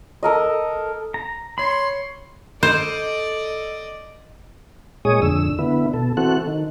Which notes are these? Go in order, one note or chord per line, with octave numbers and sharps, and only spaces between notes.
A4 A#4 D#5
A#5
C#5 B5 C6
A4 C5 D5 D#5
A#2 G#3 G#4 C#5 D#6
F2 D3 E6
D3 B3 E4
B2 A4
E3 C4 F#4 A4 F#6
D#3